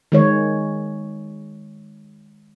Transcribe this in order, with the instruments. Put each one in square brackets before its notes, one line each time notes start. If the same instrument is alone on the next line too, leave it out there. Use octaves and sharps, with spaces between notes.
[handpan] D#3 G#3 C#5